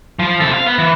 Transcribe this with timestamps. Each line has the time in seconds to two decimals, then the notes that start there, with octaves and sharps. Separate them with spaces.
0.19 F3
0.40 C3 A4
0.53 F5
0.66 B3
0.78 E3